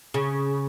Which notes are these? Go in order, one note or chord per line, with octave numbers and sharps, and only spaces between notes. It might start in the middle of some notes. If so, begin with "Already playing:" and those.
C#3